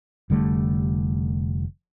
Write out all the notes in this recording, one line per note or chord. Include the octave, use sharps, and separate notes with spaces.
F1 D3 G3 A3